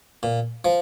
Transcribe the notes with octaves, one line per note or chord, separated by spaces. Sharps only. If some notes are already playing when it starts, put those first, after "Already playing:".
A#2
F3